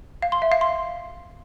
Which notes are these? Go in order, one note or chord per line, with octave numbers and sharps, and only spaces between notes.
F5
C6
E5
F5
C6